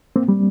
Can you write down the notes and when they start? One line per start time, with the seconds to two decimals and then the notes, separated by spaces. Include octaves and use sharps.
0.16 A#3 C4
0.28 G3